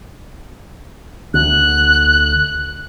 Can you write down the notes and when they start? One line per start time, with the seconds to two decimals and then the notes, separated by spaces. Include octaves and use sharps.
1.34 D2 F#6